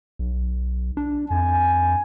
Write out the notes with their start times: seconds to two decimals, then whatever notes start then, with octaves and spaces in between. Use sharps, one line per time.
0.19 B1
0.97 D4
1.31 F2 G#5